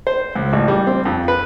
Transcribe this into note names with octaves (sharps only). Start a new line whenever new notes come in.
C5
C#2
A1
G3
C4
F2
B4